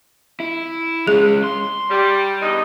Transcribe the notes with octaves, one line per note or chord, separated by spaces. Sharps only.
E4
G#3 C#4 G#4
C6
G3
E2 G2 D#4